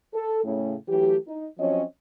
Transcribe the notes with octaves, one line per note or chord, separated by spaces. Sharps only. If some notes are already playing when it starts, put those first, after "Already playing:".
A4
A2 C#3 A3
E3 F#3 A3 G4
D#4
F3 F#3 C4 C#4 C#5 D#5